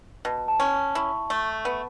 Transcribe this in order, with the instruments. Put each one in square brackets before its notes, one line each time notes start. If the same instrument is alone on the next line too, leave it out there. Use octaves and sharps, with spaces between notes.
[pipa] B2 [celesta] A5
[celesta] A5
[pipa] C#4
[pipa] E4 [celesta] C#6
[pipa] A3
B3